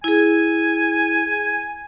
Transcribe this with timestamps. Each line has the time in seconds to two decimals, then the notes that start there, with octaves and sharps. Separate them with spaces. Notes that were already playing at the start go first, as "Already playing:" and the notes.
0.04 E4 G#4 G#5